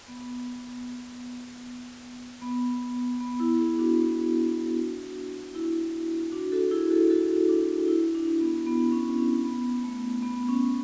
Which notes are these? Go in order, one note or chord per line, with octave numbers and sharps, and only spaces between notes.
B3
B3
B3
E4
E4 G#4
D4 F#4
E4
D4 F#4
F#4 A4
E4 G#4
F#4 A4
F#4 A4
D4 F#4
E4
D4
B3
B3
C#4
C#4
B3
A3
B3
C#4